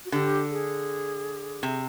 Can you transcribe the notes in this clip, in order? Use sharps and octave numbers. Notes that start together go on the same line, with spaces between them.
F#4
D3 G4
G#4
C3